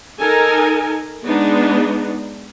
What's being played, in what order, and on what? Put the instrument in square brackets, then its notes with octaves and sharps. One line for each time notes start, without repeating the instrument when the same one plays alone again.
[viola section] D#4 A4 A#4 G#5
G#3 B3 D4 D#4